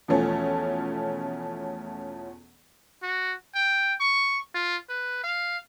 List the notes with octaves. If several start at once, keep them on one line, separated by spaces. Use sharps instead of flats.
E2 B2 F3 A3 C#4
F#4
G5
C#6
F4
B4
F5